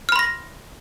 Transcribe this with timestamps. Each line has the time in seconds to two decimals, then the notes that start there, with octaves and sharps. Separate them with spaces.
0.09 F6
0.12 B5
0.16 C6
0.19 A#6